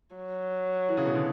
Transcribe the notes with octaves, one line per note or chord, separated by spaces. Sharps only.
F#3
E3
C#3
B2
D3